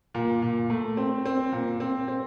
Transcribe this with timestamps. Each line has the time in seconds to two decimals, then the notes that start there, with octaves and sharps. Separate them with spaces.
0.14 A#2
0.42 A#2
0.70 A3
0.97 C4
1.26 C4
1.52 A#2
1.80 C4
2.08 C4